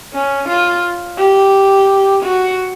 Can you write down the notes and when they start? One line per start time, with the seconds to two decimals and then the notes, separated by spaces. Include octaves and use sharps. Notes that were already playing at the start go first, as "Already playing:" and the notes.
0.14 C#4
0.49 F4
1.19 G4
2.23 F#4